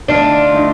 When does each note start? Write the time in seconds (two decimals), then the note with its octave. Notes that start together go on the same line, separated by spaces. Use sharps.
0.08 D3 A3 D4 D#4 F4
0.51 D3 A3 D#4